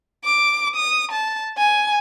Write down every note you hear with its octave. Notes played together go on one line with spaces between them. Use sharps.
D6
D#6
A5
G#5